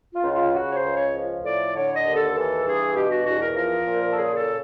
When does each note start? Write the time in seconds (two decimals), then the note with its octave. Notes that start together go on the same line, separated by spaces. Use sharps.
0.14 F4
0.23 C#2
0.34 F4
0.53 C#3 F#4
0.69 C#5
0.74 C5
0.84 C#2
0.94 C#5
1.14 F3
1.44 A2 D5
1.75 D3 C#5
1.94 D#5
2.05 D#2
2.15 A4
2.35 E3 A4
2.65 G2 G#4
2.95 B2 G4
3.11 F#4
3.25 E2 F#4
3.41 A#4
3.55 F3 A#4
3.85 A#2
4.10 A4
4.16 C#3 G#4
4.36 A4